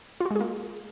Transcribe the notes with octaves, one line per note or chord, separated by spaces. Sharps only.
F4
F#4
G#3
G#4
A#3